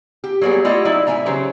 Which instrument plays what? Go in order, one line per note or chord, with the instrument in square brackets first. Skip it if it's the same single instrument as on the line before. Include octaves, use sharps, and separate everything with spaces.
[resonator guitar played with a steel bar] G4
F#3 G3 A#3 B3 G#4
A3 E4 F4 G4 D5 D#5
F#3 D#4 E4 D5 E5
A2 A3 E5 G#5 A#5
C#3 F#3 G4 C5